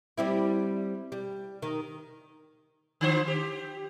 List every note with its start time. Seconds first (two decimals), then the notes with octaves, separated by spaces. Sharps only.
0.18 G3 C4 E4
1.12 G3
1.62 D#3
3.01 D3 F3 C5
3.28 G4